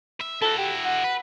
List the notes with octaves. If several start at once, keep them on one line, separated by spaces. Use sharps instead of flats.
E5
E4 F#4 A4
G4
F#5
B4